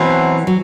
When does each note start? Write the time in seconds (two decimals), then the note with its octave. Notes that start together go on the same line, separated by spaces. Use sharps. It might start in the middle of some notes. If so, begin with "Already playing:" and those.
Already playing: B2 E3 F#3 C4 E4
0.47 F#3